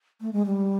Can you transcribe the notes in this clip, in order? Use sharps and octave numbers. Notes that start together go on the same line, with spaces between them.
A3
G#3
G3